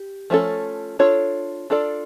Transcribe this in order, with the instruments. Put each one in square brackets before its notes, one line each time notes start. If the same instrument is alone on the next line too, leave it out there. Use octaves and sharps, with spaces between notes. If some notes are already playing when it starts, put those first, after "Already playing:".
Already playing: [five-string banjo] G4
F3 A3 C#4 F#4 A4
D4 F4 A4 C#5
D4 F4 A4 D5